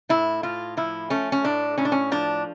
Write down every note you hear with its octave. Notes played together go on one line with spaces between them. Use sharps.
A2 E4
A2 F4
F3 E4
A3 C#4
C#4
A2 D4
A2 C#4
D4
C#4
F3 D4